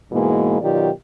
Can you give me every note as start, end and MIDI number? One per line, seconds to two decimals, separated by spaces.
0.12 0.57 44
0.12 0.57 47
0.12 0.57 52
0.12 0.57 56
0.12 0.57 58
0.61 0.89 47
0.61 0.89 51
0.61 0.89 54
0.61 0.89 65
0.61 0.89 67
0.61 0.89 74